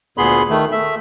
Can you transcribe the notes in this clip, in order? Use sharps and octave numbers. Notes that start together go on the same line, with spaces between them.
D2 A#2 B3 G#4 B5 C6
D#3 A3
A3 E5